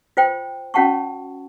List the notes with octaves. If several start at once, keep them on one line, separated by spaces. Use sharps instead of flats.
F4 C5 G5
C#4 F#4 F#5 A5 C#6